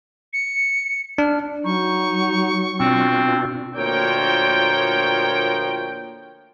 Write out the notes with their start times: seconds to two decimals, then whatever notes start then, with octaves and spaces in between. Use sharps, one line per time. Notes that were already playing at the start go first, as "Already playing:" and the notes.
0.33 C#7
1.18 D4 F6
1.64 F#3 D#4 C#6
2.80 B2 C4 D4 F4
3.76 D2 A#2 F3 A#4 C#5 G5